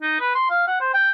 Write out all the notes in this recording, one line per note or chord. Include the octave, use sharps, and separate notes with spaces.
D#4
B4
C6
F5
F#5
C5
G5